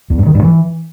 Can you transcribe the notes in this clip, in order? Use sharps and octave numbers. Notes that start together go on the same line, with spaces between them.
E2
G2
D#3
G2
E3